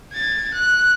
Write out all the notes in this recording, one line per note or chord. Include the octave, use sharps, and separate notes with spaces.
G#6 A6
F#6